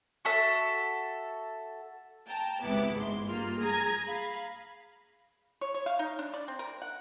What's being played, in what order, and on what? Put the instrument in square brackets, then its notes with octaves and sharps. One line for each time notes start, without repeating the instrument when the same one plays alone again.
[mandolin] F#4 A4 E5
[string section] G5 A5 A#5
G#1 C#2 C3 B3 E4 D6
G#2 G#3 C6
G2 A#3 F4
G#4 A#5 D#6 G#6
F5 B5
[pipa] C#5
C#5
F5
D#4
D4
D5
C4
A#4
F#5